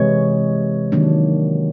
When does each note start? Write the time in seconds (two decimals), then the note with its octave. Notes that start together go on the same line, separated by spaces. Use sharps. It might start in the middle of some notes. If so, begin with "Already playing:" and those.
Already playing: C3 E3 G#3 C#5
0.92 D#3 F#3 A#3 D4